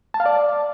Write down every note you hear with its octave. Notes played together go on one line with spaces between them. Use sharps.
A5
F5
D5